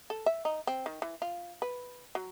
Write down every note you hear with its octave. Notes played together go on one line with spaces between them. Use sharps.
A4
E5
D#4
C4
D#3
E3
F4
B4
F#3